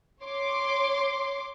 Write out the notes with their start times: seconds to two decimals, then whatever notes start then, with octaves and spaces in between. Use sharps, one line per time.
0.23 C#5 C6 D6